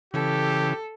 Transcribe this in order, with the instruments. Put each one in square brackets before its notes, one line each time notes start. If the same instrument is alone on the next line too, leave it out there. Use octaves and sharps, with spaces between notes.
[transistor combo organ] C#3 E3 [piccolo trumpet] G4 [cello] A4